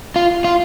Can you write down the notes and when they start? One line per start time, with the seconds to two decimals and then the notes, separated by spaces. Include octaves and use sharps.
0.16 F4
0.44 F4